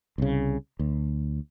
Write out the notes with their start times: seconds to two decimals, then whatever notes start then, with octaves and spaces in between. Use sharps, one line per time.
0.18 C2 C#3
0.79 D2